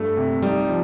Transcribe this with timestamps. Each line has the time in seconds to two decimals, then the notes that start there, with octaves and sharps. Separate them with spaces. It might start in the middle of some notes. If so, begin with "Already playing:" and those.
Already playing: G2 A3
0.17 C3
0.43 G3 D#4
0.68 F3